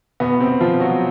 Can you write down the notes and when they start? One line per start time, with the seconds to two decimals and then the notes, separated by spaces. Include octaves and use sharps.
0.20 E2 B2 B3
0.41 C3 C4
0.47 E2
0.60 F3 F4
0.74 B2
0.80 F#3 F#4